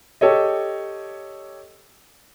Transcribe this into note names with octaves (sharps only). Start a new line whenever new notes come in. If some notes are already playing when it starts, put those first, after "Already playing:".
G4 A4 C#5 D#5